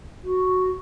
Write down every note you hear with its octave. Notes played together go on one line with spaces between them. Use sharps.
F#4